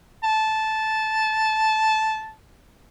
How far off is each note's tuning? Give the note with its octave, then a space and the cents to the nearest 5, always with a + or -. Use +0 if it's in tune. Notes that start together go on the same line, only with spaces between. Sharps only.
A5 -10